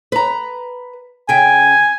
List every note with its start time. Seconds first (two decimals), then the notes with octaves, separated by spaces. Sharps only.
0.12 B4 A#5
1.29 C#3 G5 G#5